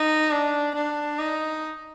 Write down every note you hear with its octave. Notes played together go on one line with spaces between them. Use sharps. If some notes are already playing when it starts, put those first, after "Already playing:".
Already playing: D#4
D4
D4
D#4